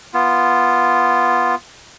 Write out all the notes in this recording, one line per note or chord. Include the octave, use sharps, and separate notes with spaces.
B3 F4